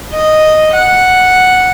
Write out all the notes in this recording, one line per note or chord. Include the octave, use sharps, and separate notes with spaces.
D#5
F#5